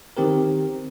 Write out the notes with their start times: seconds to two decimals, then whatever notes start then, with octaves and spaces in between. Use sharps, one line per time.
0.17 D#3 C4 G4 A#4